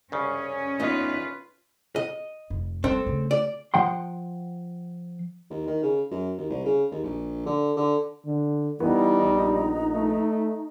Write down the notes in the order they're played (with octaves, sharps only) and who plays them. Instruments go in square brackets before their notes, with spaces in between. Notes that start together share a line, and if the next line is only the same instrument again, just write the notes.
[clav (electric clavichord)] C2 C#3 [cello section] C#4
[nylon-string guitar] E2 D#4 D#5 [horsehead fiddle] F4 B4
[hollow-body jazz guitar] D#5
[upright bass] F1
[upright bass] G3 [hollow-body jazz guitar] C4 A4
[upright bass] C#3 A3
[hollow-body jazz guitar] D5
F3 F#5 G5 C6
[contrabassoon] D#2
D#3
C#3
F#2
D#2
C2
C#3
D#2
A#1
D3
D3
[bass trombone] D3
[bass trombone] E3 [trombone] G3 [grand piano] B3 [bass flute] D#4
[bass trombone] A#1
[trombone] A3